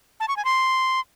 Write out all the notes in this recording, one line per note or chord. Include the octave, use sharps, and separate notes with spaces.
A5
C#6
G#5
C6